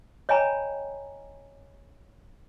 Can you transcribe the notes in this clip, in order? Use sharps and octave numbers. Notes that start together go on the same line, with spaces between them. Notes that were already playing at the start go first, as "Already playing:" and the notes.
C#5 D#5 G5 G#5 A#5 B5